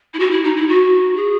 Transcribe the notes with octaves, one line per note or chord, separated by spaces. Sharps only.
E4
F#4
E4
D#4
E4
F#4
G#4